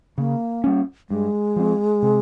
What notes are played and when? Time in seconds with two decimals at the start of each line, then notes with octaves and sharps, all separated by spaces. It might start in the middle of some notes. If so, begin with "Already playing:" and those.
0.18 C#3 A#3
0.64 G3 C#4
1.10 G2 G#3
1.56 F3 C4
2.03 C3